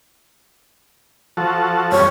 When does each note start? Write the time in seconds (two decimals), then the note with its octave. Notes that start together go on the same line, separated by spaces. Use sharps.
1.37 F3 F#4 A4
1.92 F2 G3 C#5